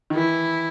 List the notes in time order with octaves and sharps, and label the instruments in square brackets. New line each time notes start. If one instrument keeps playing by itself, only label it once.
[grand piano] D#3
[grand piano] E3 [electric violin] E4